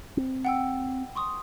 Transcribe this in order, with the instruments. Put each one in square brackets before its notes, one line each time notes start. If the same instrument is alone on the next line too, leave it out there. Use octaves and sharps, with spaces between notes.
[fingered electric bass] C4
[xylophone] F#5 G5 E6
C6 C#6 D#6